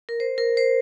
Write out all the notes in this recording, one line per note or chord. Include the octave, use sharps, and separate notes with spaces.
A#4
C5
A#4
C5